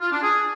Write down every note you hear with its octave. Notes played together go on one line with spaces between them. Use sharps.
F4
D4
G#4